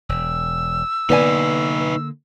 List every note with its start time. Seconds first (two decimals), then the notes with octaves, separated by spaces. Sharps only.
0.09 E1 E6
1.10 D3 A#3 B3 D#4 B4 D5 G#5